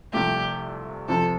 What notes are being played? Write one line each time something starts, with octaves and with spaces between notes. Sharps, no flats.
C2 C3 F3 A3 G4
F2 C3 F3 C4 A4